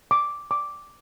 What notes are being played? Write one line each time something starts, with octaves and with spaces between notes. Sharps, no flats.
D6
D6